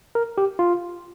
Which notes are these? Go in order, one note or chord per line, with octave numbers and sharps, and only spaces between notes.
A#4
G4
F4